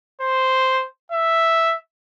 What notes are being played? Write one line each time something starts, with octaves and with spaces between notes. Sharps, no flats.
C5
E5